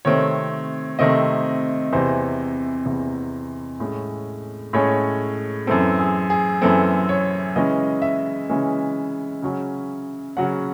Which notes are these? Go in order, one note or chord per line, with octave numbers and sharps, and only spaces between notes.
C3 D#3 A3 C4 C#5
C3 D#3 A3 C4 D#5
E2 C3 E3 C5
E2 C3 E3
A2 G#3 C#4
A2 G#3 C#4 C#5
F#2 E3 C4 A4
G#4
G#4
F#2 E3 C4 A4
C#5
C#3 E3 G#3 C#4 D#5
E5
C#3 E3 G#3 C#4
C#3 F#3 C#4
C#3 F#3 C#4 F#5